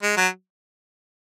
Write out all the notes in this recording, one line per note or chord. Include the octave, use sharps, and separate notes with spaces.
G#3
F#3